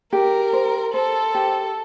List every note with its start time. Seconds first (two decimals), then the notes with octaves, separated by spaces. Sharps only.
0.13 G4 A#4
0.53 C5
0.94 A4 C5
1.35 G4